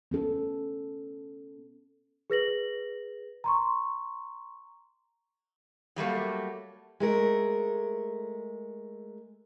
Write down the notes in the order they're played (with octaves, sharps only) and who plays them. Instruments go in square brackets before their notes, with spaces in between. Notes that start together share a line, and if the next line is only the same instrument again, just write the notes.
[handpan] B3 C#4 A4
[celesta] G#4 B4 A#6 F#7
A#5 C6 C#6
[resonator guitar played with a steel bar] F#3 G3 A3 A#3
[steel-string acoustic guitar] G#3 A3 A#4